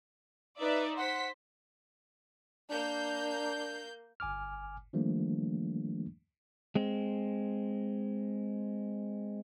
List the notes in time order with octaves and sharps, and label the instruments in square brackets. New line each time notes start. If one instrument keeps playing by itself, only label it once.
[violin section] D#4 D5 E5 [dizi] B4
[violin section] C5 B6 [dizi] F#5
[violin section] A#3 G6 [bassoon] D4
[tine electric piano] G1 G#5 D6 F6
D#3 F3 G3 A3 A#3 D4
[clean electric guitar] G#3 C4